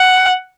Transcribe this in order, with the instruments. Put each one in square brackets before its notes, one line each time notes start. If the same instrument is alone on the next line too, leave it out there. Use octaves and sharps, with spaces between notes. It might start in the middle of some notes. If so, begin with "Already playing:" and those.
Already playing: [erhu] F#5